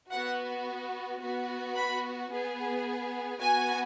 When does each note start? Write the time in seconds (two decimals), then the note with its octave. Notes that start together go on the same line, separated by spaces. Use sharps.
0.11 B3 F#4 F#5
1.21 B3 F#4
1.75 B5
2.30 B3 G#4
3.40 B3 F#4 G#5